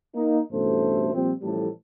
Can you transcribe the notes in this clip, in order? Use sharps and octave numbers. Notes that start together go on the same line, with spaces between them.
A#3 D#4
A1 G2 B2 A3 A4 C5
A#2 F3 G3 C4
A1 A2 E3 F3 G3 A4